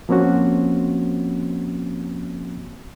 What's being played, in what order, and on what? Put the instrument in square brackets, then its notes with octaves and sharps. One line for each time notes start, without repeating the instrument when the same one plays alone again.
[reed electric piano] F3 A#3 C4 C#4 F#4